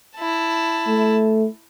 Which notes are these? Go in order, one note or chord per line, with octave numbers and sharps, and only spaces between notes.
E4 A5
A3